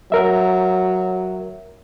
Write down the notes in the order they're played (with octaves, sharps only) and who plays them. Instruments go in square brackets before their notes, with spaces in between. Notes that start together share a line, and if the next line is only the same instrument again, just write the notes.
[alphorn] F#3 [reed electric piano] A#4 E5